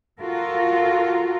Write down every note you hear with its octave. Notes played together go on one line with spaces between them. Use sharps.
F4 F#4 A4 A#4